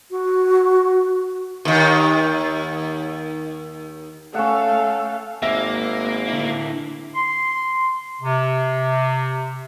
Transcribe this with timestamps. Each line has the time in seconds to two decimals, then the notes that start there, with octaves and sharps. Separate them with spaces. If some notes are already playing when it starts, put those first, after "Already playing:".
0.11 F#4
1.65 D#2 D#3
4.35 A3 C#4 A4 F5 F#5
5.42 G#1 A#3 E5
6.28 D3 E4
7.15 C6
8.22 C3